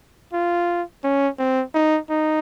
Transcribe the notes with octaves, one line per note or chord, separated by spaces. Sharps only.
F4
C#4
C4
D#4
D#4